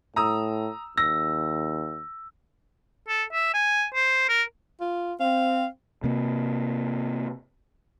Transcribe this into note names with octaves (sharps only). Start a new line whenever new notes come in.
A2 A#5 D#6 E6
D#2 E6 A#6
A4
E5
G#5
C5
A#4
F4
C4 F5
C3 A#3